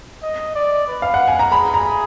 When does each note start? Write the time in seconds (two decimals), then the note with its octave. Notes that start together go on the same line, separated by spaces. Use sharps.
0.22 D#5
0.55 D5
0.87 B4
1.02 F5
1.14 F#5
1.28 G#5
1.39 A#5
1.52 G#4 B5
1.74 A#5